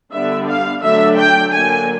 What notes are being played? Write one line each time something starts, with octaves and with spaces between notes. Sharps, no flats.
D3 G3 B3 D4 E5
F5
D3 F#3 A3 D4 E5
G5
D3 F#3 A#3 G#5